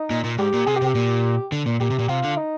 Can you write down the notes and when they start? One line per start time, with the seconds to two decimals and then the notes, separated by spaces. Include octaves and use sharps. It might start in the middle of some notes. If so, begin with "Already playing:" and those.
Already playing: D#4
0.11 A#2
0.24 A#2
0.38 G#2 G4
0.54 A#2
0.67 C3 G#4
0.77 G4
0.82 C3
0.87 G4
0.95 A#2
1.52 D3
1.66 A#2
1.81 A#2 G4
1.90 C3
1.99 A#2
2.09 C3 F4
2.24 D3
2.38 D#4